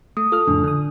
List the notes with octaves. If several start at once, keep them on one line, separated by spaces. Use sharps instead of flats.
A3 D#6
F4 A4 F6
F2 A2 C#3 D4
D3 D#6